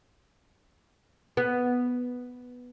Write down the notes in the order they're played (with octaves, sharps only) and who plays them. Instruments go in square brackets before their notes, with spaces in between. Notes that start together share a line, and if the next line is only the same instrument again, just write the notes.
[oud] B3